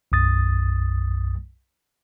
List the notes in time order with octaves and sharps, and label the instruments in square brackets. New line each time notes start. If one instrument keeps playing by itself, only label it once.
[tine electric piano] B1 F#2 D#6 A6